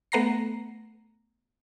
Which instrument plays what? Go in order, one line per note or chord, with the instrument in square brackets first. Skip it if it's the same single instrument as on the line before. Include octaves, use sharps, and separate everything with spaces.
[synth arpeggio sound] A3 B3 F#5 A#5 A#6 C7